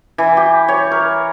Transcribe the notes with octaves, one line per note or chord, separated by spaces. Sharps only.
E3
G4
C#5
A#4